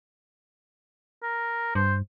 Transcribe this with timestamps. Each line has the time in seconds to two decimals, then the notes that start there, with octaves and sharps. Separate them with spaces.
1.23 A#4
1.75 G2 C5